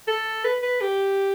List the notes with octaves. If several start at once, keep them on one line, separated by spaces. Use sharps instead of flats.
A4
B4
B4
G4